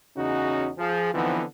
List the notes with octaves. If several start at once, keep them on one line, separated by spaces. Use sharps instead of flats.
E2 C#3 C#4 D#4 F#4
F3 G#4
D3 E3 F3 B3 C4 D#4